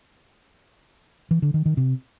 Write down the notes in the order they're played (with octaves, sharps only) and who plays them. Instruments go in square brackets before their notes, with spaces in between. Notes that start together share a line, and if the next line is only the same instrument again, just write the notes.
[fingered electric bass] E3
D3
D#3
D#3
C3